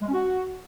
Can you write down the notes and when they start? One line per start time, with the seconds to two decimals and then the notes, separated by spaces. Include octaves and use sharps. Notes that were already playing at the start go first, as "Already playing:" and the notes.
0.02 G#3
0.07 C#4
0.12 F#4